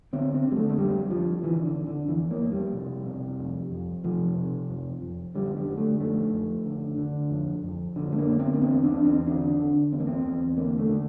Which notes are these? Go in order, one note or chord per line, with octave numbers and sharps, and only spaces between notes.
D3 C4
C4
D3
G3
A3
A3
F2 G3
F2 F3
D3 E3
D3
D3
D3
F2 E3
A#3
F2
G3
C3
C3
F2
F2
C3 F3
C3
F2
F2
D3 G3
G3
D3
A3
F2 A3
F2
D3
D3
F2
F2
D3
A3
A#3
D3
C4
A#3
E2 C4
D4
E2
C4
D3 D4
D3
E2 C4
A#3
C4
E2
D3 A#3
A3
D3